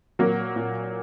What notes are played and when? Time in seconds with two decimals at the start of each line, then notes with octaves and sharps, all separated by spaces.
0.19 A#2 F#3 A#3
0.56 A#2